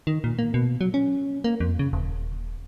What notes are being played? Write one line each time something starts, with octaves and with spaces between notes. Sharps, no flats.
D#3
A#2
A#3
B2
F#3
C#4
A#3
F2
C#3
D#1